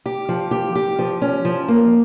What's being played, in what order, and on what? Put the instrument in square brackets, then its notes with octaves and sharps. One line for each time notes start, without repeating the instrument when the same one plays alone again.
[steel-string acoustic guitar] G4
F3
G4
G4
F3
C#4
F3
A#3